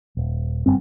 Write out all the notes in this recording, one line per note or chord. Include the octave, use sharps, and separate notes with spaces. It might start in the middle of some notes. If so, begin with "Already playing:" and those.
D#1
F#1 G2 C4